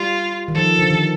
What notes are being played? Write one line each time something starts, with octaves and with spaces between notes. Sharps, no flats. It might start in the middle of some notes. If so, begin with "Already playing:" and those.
Already playing: G3 F4
D#3
F3 A4
D3
D#3